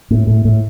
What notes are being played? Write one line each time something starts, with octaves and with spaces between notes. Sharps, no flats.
A2
A2
A2